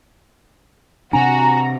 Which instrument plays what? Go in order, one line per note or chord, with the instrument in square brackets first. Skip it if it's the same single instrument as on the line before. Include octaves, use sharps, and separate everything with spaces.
[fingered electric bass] C3 C4 D4 [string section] F#4 [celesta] G#5 [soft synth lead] A#5